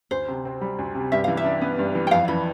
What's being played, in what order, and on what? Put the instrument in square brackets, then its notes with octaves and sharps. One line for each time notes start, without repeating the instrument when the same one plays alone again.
[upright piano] D2 [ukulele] C5
[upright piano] C3
C4
G3
D2
C3
[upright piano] G2 [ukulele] E5
[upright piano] E3 [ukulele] F5
[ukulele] E5
[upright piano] D4
B3
G2
E3
[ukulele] G5
[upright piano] F2 [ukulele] F5
[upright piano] E3 [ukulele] B5